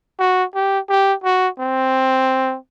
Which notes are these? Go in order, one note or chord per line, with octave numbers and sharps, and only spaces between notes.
F#4
G4
G4
F#4
C4